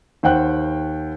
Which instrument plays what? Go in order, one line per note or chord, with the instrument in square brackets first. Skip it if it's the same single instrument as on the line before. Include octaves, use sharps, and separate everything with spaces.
[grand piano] D#2 C5 F#5 G5 F#6